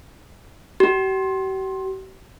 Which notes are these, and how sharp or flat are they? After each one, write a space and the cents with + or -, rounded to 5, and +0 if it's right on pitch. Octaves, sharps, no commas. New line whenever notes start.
G4 -45